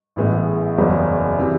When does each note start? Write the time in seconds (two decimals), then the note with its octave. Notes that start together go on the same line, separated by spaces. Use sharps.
0.16 A1 A2 E3 G#3 B3
0.78 F#1 E2 C#3 F#3
1.39 C3 E3